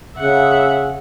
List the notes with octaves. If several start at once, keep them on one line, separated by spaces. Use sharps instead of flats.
C#3 E5 F#5